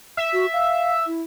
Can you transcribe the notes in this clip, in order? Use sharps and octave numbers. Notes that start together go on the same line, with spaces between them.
E5
F#4
F5
E4